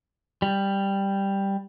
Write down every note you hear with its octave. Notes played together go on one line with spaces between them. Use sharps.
G3